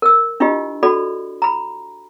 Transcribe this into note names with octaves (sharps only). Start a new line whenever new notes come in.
A#4 E6
D4 E4 F4 G4 D#5
F#4 A4 D5 B5
A#5 B5